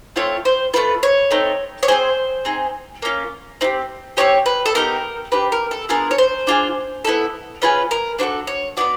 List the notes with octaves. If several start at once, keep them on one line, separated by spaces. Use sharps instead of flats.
A3 C4 F4 C#5
C5
A3 C4 F4 B4
C#5
A3 C4 D#4
C#5
C4 E4 G#4 C5
C4 D#4 G#4
A#3 C#4 F4
C4 D#4 G4
C4 D#4 G4 C#5
B4
A4
B3 D#4 G4 A#4
D4 G4 B4
A#4
A4
B3 D4 F4 G#4 A#4
C#5
C5
D4 F4 G#4
B3 E4 A4
C#4 F4 G#4 B4
A#4
D4 F#4 A4 C5
C#5
B3 D4 F#4 D5